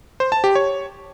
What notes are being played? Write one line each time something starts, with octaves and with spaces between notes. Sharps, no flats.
C5
A5
G4
C#5